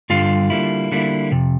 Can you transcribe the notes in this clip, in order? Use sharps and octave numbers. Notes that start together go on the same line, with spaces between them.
G2 D3 G3 F4 F5
D3 G3 A#3 E4
D3 G3 A#3 E4
F2 C3